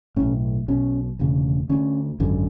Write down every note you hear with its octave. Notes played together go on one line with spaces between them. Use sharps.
B1 A2 C#4
B1 B2 C#4
E1 D2 C#3
D2 D3 C#4
G#1 F#2 D3